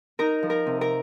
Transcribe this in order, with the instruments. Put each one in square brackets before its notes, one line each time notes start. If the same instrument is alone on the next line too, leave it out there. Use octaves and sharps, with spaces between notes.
[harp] D#4 A#4 A#5
F3
A#4 A#5
C3
A#4 A#5